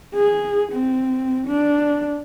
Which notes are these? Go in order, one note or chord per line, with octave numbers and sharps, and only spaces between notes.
G#4
C4
D4